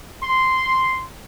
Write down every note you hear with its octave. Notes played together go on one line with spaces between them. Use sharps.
C6